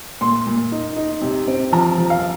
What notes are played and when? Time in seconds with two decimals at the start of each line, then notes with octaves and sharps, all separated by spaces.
0.21 A#2 C6
0.47 A#2
0.72 D#4
0.96 D#4
1.22 C3
1.48 C4
1.72 F3 A#5
1.98 F3
2.10 F5